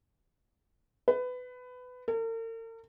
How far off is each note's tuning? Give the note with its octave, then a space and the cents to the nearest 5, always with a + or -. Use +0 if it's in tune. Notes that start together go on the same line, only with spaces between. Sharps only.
B4 +20
A#4 -45